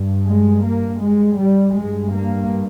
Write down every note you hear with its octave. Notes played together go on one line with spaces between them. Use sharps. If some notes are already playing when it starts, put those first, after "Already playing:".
Already playing: G2
G#3
A#3
G#3
G3
G2 G#3
A#3